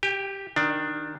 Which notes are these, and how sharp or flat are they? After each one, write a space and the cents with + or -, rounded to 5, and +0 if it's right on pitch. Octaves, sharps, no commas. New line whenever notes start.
G4 +0 G5 +40
D#3 -5 D4 +10